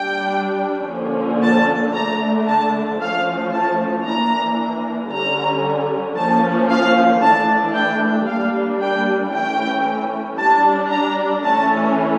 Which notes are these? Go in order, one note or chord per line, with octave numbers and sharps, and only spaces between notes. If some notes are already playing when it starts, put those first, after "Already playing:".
Already playing: G3 D4 G5
D3 F3 A#3 C#4
A5
D3 A3 D4 A#5
A5
F3 A3 C#4 F5
A5
E3 A#3 D4 A#5
D3 G3 C#4 A#5
F3 A#3 C#4 A5
F5
E3 A3 D4 A5
G5
G3 A#3 D4 F5
G5
E3 A3 C#4 G5
G3 D4 A5
A#5
E3 A3 C#4 A5